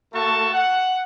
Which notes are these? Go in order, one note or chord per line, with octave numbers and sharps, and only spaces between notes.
A3 A#3 F#4 A4 A5 C#6
F#5